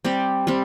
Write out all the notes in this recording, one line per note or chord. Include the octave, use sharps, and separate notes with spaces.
G3 C4 G4 D5
G3 C4